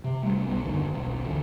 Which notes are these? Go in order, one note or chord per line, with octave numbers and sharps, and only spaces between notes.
C3
C3 G3 A3
B1 E2 B3
E2 G2 D3 D#3
D#1 B1
D2 D3 E3